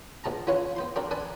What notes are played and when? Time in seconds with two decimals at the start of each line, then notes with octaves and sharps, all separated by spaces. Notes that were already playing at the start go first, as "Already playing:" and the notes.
0.24 A#1 B2 A5 A#5
0.47 E3 C#4 F4 F#4 B4 C#5
0.76 B3 C5 C6
0.96 C4 D4 F#4 A4 A#4
1.11 D4 A4 B4 D5 G#5